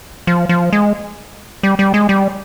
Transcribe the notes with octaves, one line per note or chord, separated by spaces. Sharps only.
F3
F3
G#3
G3
G3
G#3
G3